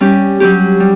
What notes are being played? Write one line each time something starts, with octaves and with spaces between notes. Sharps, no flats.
G3 C#4 G4
F#3 C#4 G4
G3